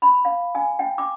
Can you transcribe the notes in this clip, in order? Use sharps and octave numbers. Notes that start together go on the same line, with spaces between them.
B5
F5
G#5
G5
D6